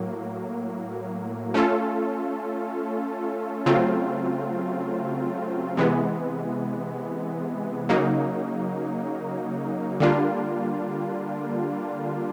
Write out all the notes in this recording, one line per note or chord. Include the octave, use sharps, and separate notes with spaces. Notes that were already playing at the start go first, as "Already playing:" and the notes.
Already playing: A2 F#3 A#3
A3 C#4 F4 A4
C#3 F#3 A3 C4 F4
C3 E3 G#3 B3
C#3 F#3 A#3 D#4
D3 G3 A#3 D4 F4